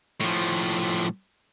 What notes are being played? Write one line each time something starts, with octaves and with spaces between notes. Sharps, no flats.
A2 F3